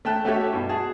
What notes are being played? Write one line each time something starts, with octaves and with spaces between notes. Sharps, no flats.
A3 G5 A5 F#6
A3 F#4 G4 A4 C#5 E5
G2 B2
F#4 G#4 A5